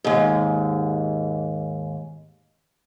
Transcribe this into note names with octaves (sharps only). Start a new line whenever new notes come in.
D#2 G#2